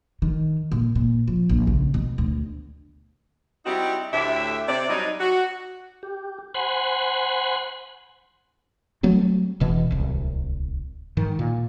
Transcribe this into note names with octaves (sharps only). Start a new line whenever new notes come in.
D#3
A#2
A#2
F3
A#1
C#2
B2
D2
G3 C4 D#4 E4 F#4 G4
D2 A2 G4 D5 E5
C3 D5
F#3 G3 D4 D#4
F#4
G4
C5 F#5 G#5 B5 C6
F#3 G3 A3 C4
E1 B2 E3
D1 C2
G#2 D#3
A#2